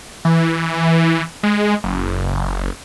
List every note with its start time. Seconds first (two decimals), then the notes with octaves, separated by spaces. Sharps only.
0.25 E3
1.43 G#3
1.84 F#1